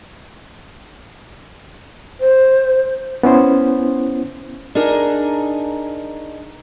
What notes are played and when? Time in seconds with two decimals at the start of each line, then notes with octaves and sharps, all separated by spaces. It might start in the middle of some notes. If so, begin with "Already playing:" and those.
2.20 C5
3.23 B3 C#4 E4 C5
4.75 D4 D#4 G#4 A#4